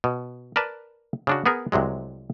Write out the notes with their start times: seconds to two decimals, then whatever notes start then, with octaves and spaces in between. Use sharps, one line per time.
0.04 B2
0.56 A#4 B4 D5 A5
1.27 C#3 D4 F#4
1.46 B3 G#4 A#4
1.72 C2 C3 F#3 G#3